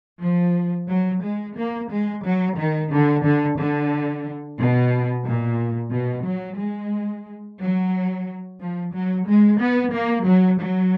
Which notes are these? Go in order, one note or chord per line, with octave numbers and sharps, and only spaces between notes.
F3
F#3
G#3
A#3
G#3
F#3
D#3
D3
D3
D3
B2
A#2
B2
F#3
G#3
F#3
F3
F#3
G#3
B3
A#3
F#3
F#3